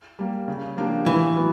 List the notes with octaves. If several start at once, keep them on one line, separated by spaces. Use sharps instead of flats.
G3 A#3
C#3
F3 A#3 D4 G4
A2 E3
F#3 B3